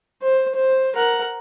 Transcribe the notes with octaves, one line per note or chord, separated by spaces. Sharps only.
C5
C5
A#4 F#5